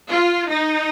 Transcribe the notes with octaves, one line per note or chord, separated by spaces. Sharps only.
F4
D#4